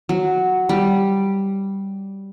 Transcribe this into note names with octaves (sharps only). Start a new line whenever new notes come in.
F#3
G3